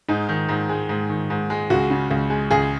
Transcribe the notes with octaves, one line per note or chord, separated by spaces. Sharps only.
G#2 D#4
D#3
G#2
G#3
G#2
D#3
G#2
G#3
C#2 F#4
C#3
C#2
G#3
C#2 G#4